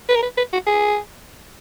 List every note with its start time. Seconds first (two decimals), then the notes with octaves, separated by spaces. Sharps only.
0.09 B4
0.16 A#4
0.23 B4
0.37 B4
0.53 F#4
0.66 G#4